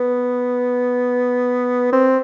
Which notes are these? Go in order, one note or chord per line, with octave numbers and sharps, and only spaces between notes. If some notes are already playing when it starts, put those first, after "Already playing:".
Already playing: B3
C4